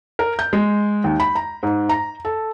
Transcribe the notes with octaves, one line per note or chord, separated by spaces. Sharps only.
A#4
G6
G#3
D#2
B5
A#5
G#2
A#5
A4